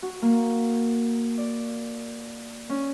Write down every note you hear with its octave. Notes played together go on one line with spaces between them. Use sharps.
F#4
A#3
D5
C#4